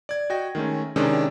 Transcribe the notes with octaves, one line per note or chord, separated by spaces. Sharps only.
D5 G#6
F#4 D#5 G5 A#6
D#3 G#3 A3 C#4
C3 D#3 G#3 C#4 D4